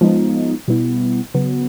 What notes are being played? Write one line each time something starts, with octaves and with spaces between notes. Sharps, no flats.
F3 G#3 B3 D#4
B2 G3 B3 E4
C#3 F#3 B3